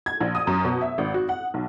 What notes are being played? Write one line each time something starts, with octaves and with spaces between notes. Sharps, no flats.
G#6
A#1
D#6
F#2
B2
E5
G#1
F#4
F#5
B1